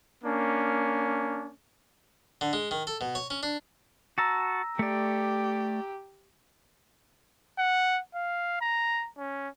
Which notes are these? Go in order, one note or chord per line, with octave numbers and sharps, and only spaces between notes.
A#3 C#4 D4
D3
G#3
D#3
A4
B2
C#5
C#4
D4
F#4 A5 A#5 E6 A#6
A3 G4 D5
F#5
F5
A#5
C#4